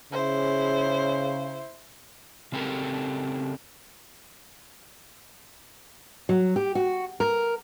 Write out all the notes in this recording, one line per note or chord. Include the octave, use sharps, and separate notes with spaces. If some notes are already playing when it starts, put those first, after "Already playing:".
C#3 E4 C5
C#3 C4 G4 A4 A#4
F#3
G4
F#4
A#4